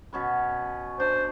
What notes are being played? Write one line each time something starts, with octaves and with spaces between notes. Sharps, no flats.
B2 C#4 B4
D4 C5